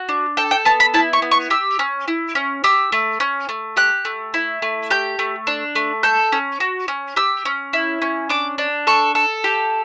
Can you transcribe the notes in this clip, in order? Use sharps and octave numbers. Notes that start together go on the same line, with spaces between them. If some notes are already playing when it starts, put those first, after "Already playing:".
Already playing: F#4
D4
A4 G5
G5
B3 A5
B5
E4 A5
C#6
B3
C#6
G4 E6
C#4
E4
C#4
G4 E6
A3
C#4
A3
G4 F#6
A3
E4
A3
G4 G6
A3
D4
A3
A4 G6
C#4
F#4
C#4
G4 E6
C#4
E4
C#4
D4 D6
D4
A4 C#6
A4
G4